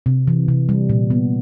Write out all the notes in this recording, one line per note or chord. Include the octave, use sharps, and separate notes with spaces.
C3
E3
C3
G3
A#2
B3